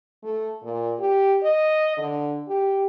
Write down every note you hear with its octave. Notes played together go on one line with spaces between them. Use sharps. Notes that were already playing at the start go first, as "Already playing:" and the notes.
A3
A#2
G4
D#5
D3
G4